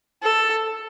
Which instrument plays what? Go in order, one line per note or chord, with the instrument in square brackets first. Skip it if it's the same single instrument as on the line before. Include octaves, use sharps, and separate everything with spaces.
[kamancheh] A4